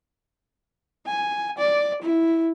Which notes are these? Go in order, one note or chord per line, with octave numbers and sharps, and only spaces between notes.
G#5
D5
E4